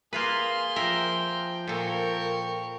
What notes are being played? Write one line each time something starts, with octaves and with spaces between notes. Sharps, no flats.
A#3 F4 G#4 B4 C6
F3 A#4 E5 G5
A#2 A4 A#4 C#6